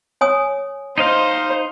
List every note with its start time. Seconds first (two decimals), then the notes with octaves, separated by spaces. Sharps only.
0.21 C#5 G#5 D#6
0.98 D#4 C5 D#5 F5